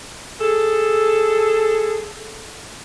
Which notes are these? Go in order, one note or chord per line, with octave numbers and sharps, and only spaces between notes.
G#4 A4